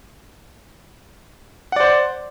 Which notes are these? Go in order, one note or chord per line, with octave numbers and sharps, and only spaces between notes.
C5 D5 F#5